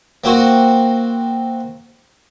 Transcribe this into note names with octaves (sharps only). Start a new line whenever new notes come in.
A#3 C4 F#4 C#6